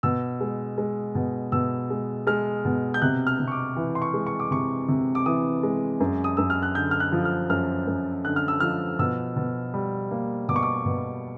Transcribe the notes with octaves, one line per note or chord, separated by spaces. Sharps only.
B2 E6
G#3
G#3
B2
B2 E6
G#3
G#3 F6
B2
G6
C3 F#6
F6
C3
C#6
D6
E3
C6
C#6
G#3
C#6
D6
C3 C#6
C3
D6
E3 D#6
G#3
F#2
D#6
F#2 E6
F6
F#6
D3 G6
F6
F#6
F3
F6
F#2 F6
F#2
D3 F#6
F6
E6
F3 F6
B2 E6
B2
G3
A#3
B2 D6
C#6
D6
B2